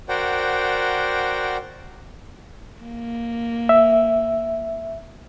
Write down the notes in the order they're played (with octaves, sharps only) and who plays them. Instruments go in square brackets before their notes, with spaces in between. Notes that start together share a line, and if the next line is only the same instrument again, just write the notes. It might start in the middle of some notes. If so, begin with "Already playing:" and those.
[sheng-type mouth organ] F#4 A#4 C5 D5 F#5 G5
[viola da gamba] A#3
[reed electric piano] E5